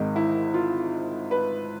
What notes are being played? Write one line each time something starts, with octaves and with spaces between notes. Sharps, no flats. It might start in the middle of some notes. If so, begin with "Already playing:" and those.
Already playing: G#1 G#2 D#3 D#4
E4
F4
B4